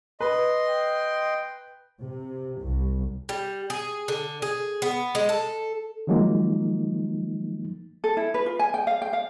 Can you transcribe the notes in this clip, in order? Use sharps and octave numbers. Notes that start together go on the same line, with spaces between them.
B4 D#5 C6
G5
C3
C2
G3
G#4
D3
G#4
B3
G#3
A4
D#3 F3 F#3 G#3 A#3 D#4
A4
E4
B4
F4
G#5
G5
F5
G5
F5